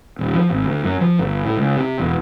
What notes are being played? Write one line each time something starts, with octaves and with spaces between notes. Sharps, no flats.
D#1
F3
G#1
D2
F#2
F3
G1
A2
C#2
C3
E1